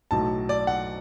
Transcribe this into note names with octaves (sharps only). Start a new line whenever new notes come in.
B1 A2 F#3 A5
D5
F#5